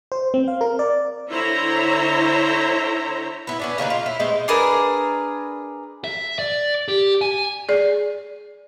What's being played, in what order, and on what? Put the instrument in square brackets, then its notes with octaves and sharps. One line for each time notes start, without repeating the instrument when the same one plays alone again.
[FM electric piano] C5
C4
F5
A#4
D5
[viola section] D3 E4 C5 C#5 A#5
[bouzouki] B3 E4
B3 C#4 D4
C#3 A#3 D#4 B4
F4
E4
G#3 A3 B3 C4
[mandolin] D4 G#4 A#4 B4
[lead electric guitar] E5
D5
G4
G#5
[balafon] G#4 D5